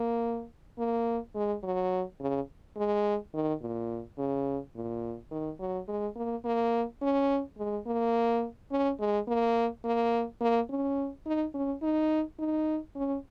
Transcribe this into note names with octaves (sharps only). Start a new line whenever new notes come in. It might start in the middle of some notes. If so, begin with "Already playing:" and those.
Already playing: A#3
A#3
G#3
F#3
C#3
G#3
D#3
A#2
C#3
A#2
D#3
F#3
G#3
A#3
A#3
C#4
G#3
A#3
C#4
G#3
A#3
A#3
A#3
C#4
D#4
C#4
D#4
D#4
C#4